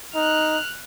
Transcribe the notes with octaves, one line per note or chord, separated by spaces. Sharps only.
D#4 F6 F#6